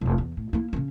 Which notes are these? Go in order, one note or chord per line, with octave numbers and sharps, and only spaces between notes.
F1 C2
E2
A2
A#3 E4
C#3 C#4